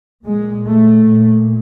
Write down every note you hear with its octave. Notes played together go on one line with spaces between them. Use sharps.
A#2 G#3
A3
A#2